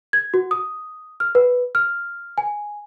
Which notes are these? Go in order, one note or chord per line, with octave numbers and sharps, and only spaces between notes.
G#6
F#4
D#6
F6
B4
F6
G#5